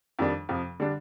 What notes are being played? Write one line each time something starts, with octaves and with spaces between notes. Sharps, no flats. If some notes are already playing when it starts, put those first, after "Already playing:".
F2 D#3 G3 D4
F2 C3 F3
D3 G3 D4